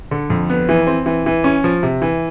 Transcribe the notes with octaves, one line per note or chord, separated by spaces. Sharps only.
D3
F2
B3
E3
C4
E3
E3
C#4
F3
C3
E3